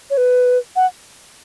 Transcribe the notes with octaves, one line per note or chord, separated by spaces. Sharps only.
C#5
B4
F#5